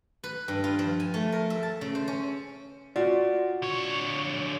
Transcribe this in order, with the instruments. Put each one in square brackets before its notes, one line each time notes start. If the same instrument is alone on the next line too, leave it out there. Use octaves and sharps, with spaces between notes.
[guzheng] B4
G2
F4
F3
G#5
A3
A#4
E5
A5
C#3
C5
C#4
[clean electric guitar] F4 D5 [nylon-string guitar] F#4
[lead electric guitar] D3 C#5